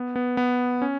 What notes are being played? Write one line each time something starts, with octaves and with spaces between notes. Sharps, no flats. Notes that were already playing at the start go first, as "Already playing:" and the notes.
Already playing: B3
B3
B3
C#4